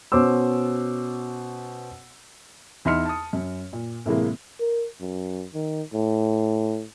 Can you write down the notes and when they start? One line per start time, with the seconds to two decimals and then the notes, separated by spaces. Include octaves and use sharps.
0.12 B2 C#4 C5 D6 E6
2.85 E2 D#4 E5 C6 F6 C#7
3.05 A5 D#6
3.33 F#2
3.73 A#2
4.06 A2 C3 E3 G#3 A#3
4.60 A#4
5.01 F#2
5.54 D#3
5.94 A2